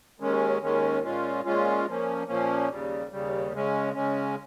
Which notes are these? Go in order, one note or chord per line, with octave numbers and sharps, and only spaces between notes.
D#2 D#3 G#3 C#4
D#2 D#3 G#3 C#4
A#2 G#3 C#4 F4
A#2 G#3 C#4 F4
A#2 F3 A#3 C#4
A#2 F3 A#3 C#4
D#2 C#3 G3
D#2 C#3 G3
C#3 G#3 C#4
C#3 G#3 C#4